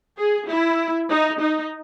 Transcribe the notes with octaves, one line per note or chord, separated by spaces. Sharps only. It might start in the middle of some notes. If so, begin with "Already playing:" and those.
G#4
E4
D#4
D#4